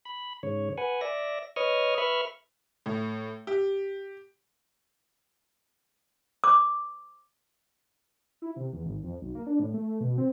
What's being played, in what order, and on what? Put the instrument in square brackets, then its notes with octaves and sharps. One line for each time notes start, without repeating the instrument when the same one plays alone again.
[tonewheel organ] B5
G#2 C#3 C#5
B4 F#5 G#5
D5 E5 A#6
B4 C#5 D#5 C#6 D#6 F6
B4 E5 B5 C#6 F6
[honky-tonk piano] A2
G4
[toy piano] D6
[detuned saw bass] E4
C3
E2
G#1
F2
B1
A#3
D4
A2
A3
B2
C4